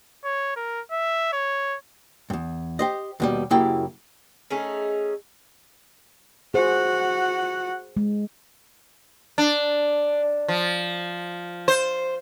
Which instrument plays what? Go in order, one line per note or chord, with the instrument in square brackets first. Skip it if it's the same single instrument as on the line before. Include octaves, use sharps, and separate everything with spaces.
[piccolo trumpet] C#5
A#4
E5
C#5
[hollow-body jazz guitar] E2 G2
G4 C5 D#5
D#2 B2 G3
F#2 C#3 A#3 E4 G4 G5
[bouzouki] A3 C#4 D#4 G#4
[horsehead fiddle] F#4 F#5 [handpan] G#4 C5
[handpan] G#3
[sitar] D4
F3
C5